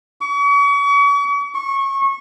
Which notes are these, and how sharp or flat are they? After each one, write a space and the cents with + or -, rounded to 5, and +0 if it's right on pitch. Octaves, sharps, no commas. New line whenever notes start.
C#6 +40
C#6 -25